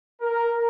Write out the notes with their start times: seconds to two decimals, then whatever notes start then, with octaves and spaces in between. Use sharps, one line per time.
0.21 A#4